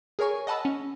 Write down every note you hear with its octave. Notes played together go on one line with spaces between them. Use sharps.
G#4 A#4 C#5 G#5 C#6
D#5 F#5 A5 B5 E6
C#4